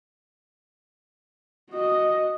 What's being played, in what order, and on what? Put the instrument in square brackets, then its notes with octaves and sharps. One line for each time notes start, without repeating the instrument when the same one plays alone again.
[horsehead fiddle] F#4 D#5